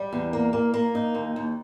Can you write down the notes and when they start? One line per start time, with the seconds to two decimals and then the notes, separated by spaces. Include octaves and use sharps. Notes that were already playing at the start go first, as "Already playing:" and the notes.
Already playing: G3
0.13 E2
0.33 A#3
0.53 A#3
0.74 A#3
0.95 D#4
1.15 D#2
1.36 D#2